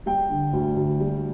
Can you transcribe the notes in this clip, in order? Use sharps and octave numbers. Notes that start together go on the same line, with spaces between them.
G3 G5
D3
D2
D2
G3